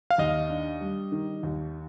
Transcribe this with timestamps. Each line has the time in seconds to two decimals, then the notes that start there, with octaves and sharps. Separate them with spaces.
0.10 F5
0.18 D#2 D#5
0.49 D4
0.81 G3
1.12 D#3
1.43 D#2